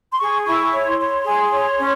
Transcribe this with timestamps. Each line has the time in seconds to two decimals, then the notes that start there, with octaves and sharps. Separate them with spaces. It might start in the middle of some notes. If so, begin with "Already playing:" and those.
0.12 C6
0.19 G#4 C#6
0.46 E4 C#6
0.72 C#5
0.85 C6
0.99 C#5
1.25 G#4
1.52 C#5
1.79 C#4